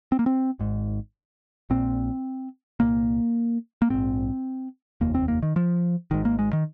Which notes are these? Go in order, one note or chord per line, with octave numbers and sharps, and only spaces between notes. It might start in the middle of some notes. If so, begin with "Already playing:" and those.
C4
A#3
C4
G#1 G#2
A#1 A#2 C4
C2 A#2 A#3
A#3
A#1 G#2 C4
F1 D#2 A#3
C4
A#3
D#3
F3
G#1 G#2 D#3
A#3
G#3
D#3